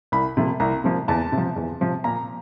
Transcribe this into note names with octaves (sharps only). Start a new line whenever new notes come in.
C2 B5
C3 F3 A#3
C2 A#5
C3 F3 A#3
E2 A5
C3
F3
E2
C3 F3
A#2 A#5